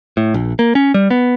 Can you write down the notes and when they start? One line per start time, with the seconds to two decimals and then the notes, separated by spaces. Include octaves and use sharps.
0.17 A2
0.34 A#1
0.59 A#3
0.75 C#4
0.94 G3
1.10 B3